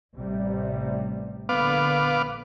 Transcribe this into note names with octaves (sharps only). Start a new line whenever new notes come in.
A1 C3 G3
A#1 D3 A#3 B3 F5 D6